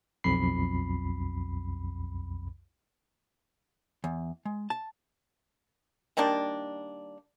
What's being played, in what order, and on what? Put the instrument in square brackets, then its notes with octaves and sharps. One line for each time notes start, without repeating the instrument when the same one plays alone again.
[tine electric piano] B1 F2 B5 C7
[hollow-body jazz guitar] E2
G#3
A5
[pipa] D#3 G3 A#3 D4